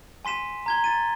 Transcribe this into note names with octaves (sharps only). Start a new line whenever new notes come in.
G#5 C6 B6 E7
A#5 G#6 G7
A6 D#7